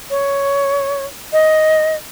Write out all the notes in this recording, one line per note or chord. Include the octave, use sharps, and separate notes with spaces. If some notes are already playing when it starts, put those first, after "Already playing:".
C#5
D#5